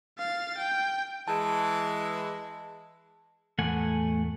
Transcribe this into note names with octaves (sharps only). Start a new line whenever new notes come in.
F5 A6
G5
E3 G#3 A5
E2 A2 E3 A3 F#5 G#5